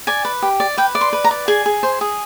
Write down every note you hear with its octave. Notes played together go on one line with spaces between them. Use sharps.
D5 G#5
B4
G4
D5
B4 G5
D5
C6
B4
A#5
D5
G#4 G#5
G#4
C5
G#4